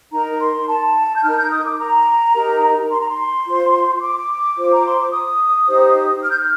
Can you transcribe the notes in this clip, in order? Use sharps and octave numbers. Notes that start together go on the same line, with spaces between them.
D#4 A#4 A#5
C6
A5
G6
D#4 A#4 F6
G6
D#6
D6
A#5
D#4 G4 A#4
C6
A#5
C6
F4 C5
D6
F4 C5
A#5
C6
D6
D#6
D#4 G4 C5
F6
G6
F6